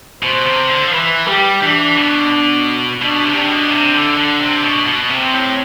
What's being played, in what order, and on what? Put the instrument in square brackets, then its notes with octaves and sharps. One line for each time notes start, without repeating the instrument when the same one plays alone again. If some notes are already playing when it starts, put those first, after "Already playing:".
[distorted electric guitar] B2 [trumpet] C5
[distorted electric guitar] C3
D3
F3
[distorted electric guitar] E3 [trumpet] B4
[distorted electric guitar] G3 [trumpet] G4
[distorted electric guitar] E3 [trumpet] D4
[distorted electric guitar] B2
[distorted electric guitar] B2 [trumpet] D4
[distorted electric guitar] C3
[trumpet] D4
[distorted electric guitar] B2
C3
D3
D3
C3
B2
B2
[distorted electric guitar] C3 [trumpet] C4
[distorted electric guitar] A2